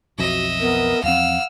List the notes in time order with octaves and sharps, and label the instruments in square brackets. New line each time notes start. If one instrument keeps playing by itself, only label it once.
[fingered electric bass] B1 F2 [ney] F#4 [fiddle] D#5 E5
[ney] B3 [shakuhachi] A#4
[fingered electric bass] E2 F3 C4 [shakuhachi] F5 [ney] F#5 [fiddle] E6 F6